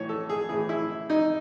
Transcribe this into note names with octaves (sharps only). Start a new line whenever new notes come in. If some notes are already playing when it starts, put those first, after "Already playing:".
Already playing: A2 E3 C#5
A4
G#4
A2 E3 G#4
E4
D#4